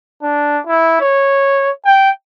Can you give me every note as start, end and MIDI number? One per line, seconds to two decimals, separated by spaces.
0.23 0.59 62
0.67 0.99 64
1.01 1.70 73
1.86 2.10 79